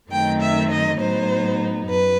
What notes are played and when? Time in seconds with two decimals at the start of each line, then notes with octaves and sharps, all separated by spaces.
0.10 F#2 D#3 A3 C4 D#4 G5
0.41 E5
0.70 D#5
0.99 A2 F#3 B3 D#4 C5
1.88 F#2 B4